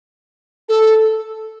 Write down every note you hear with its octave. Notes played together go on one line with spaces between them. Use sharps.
A4